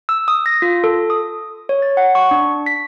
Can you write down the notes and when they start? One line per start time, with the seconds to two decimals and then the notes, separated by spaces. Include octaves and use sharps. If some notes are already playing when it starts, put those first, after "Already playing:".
0.09 E6
0.28 D#6
0.46 A#6
0.62 F4
0.84 A4
1.10 D#6
1.69 C#5
1.82 A6
1.97 F#5
2.15 C#6
2.31 D4
2.66 B6